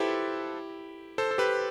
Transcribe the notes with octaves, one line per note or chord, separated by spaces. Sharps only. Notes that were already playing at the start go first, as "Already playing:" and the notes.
Already playing: E4 F4 G4 A4 B4 C5
A4 C5
A4
G4 B4